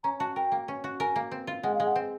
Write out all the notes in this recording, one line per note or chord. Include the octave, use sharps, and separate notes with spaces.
C#4 A#5
F#4 A5
A#4 G5
A#3
C#4
F#4
A#4 G#5
A#3
C4
F4
G#3 F#5
F5
G#3
F#5
C4